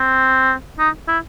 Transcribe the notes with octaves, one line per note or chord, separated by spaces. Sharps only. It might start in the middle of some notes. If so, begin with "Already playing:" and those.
Already playing: C4
D#4
E4